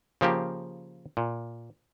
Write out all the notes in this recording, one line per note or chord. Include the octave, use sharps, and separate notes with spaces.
C#3 F3 A#3 G4
A#2